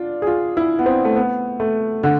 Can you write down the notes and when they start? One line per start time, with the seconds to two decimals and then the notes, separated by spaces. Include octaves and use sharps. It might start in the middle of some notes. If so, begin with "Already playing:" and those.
Already playing: D4 F4
0.22 G#4
0.27 F4
0.57 E4
0.79 B3
0.86 C4
1.05 A3
1.15 B3
1.60 A3
2.03 D3